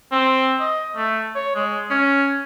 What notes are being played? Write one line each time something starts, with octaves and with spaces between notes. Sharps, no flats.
C4
D#5
A3
C#5
G#3
C#4